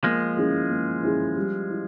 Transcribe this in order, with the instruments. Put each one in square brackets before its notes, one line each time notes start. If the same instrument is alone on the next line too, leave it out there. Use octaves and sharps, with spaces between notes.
[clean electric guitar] F3 G#3 [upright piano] A#3
[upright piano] C#4 E4 G#4
A#3
C#4 E4 G#4
G3
E4